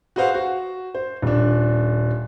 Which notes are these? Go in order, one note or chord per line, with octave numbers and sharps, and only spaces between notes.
F#4 G#4 B4 C5 F5 F#5
F#4
C5
D#1 D4